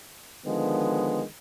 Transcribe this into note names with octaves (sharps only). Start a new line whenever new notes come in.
D3 D#3 F3 G#3 B3